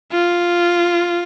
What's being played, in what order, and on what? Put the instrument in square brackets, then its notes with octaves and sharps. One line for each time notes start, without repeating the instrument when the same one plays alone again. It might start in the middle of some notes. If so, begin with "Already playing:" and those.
[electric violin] F4